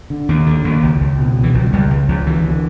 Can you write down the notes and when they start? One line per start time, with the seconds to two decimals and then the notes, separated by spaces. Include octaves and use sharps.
0.10 D3
0.29 D#2
0.46 D3
0.64 D#2
0.83 C#2
1.01 C#2
1.19 B2
1.37 B2
1.43 E3
1.54 C#2 F3
1.63 F#3
1.72 C#2 G3
1.90 C#2
2.08 C#2 F3
2.26 D3 E3
2.44 D3